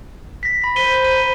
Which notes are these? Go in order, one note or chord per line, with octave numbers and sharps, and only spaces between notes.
A#6 B6
B5 B6
C5 B6 D#7 G7
A#5 D#7